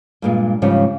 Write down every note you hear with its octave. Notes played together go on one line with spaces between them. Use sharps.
G2 A#2 G#3
G#2 C#3 F3 G3 C#4 C#5